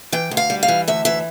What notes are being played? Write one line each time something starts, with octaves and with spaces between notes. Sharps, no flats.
E3 G5
D2
F5
G3
F5
E3
D2 E5
E3 E5